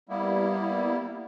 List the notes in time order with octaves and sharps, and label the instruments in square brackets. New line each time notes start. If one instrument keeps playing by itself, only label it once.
[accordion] G3 A#3 B3 E4